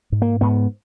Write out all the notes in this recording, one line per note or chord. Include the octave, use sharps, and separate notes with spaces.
G#2
A#3
G#2 B3